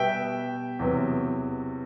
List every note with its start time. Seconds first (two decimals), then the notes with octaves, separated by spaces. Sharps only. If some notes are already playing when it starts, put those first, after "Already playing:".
Already playing: B2 G3 B3 E5 G5
0.79 E2 C3 F#3 B3